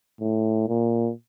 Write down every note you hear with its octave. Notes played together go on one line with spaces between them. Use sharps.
A2
A#2